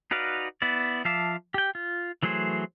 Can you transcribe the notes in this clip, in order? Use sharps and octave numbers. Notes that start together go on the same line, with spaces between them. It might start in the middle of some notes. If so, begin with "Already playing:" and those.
D#4 F#4 B4 D5 F5
B3 E4 D5
F3 E5 F5 A5 D6
G4 G5
F4
E3 F#3 A3 G#4 C5